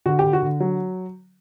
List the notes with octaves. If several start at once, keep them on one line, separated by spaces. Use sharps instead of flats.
D3 F#4
D3 G4
F#4
D3
F#3